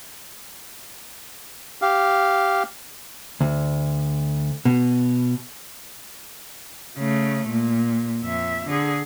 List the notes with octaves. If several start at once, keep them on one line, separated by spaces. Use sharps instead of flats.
G4 F5
D2
B2
C#3 A3
A#2
F2 E5
D3 G#4